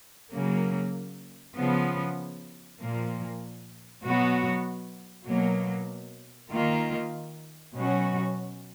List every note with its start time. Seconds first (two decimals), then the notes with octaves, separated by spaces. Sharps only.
0.32 C#3 F#3 A#3
1.56 C#3 F3 B3
2.79 A#2 F3 A#3
4.03 B2 F#3 B3 F#4
5.26 B2 F#3 A#3
6.51 D#3 A#3 F4
7.74 B2 F#3 C#4 F#4